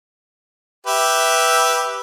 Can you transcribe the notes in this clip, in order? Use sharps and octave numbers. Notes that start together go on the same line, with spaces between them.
G4 B4 E5